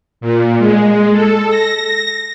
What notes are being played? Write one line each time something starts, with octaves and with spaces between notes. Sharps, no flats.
A#2
G#3
A4
A#6